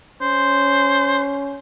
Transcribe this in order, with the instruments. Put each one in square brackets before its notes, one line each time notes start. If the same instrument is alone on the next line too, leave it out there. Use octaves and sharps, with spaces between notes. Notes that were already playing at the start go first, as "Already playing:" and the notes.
[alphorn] C#4 [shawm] C5